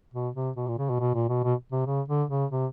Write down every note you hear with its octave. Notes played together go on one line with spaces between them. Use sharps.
B2
C3
B2
A#2
C#3
B2
B2
A#2
B2
B2
C3
C#3
D3
C#3
C3